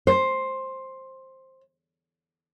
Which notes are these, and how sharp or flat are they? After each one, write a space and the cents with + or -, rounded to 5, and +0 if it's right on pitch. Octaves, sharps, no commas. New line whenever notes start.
C5 +10